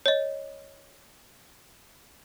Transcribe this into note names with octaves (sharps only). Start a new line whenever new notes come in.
C#5 D#5